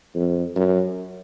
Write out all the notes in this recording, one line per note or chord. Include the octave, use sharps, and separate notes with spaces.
F2
F#2